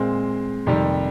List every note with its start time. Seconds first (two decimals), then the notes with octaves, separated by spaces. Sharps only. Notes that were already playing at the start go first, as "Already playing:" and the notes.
Already playing: A#2 G#3 C4
0.67 F2 C3 D#3 G3